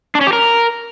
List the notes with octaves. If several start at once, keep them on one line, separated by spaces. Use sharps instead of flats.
D4
C#4
G4
A#4